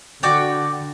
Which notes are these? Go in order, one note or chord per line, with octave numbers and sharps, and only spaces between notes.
D3 F#4 D5 G5